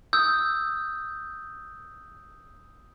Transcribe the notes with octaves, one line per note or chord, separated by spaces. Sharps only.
D#6 E6 G6